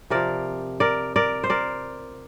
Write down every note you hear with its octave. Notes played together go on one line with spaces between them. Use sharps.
C3 F3 A#4 D5
A#4 D5
A#4 D5
C5
A#4 D5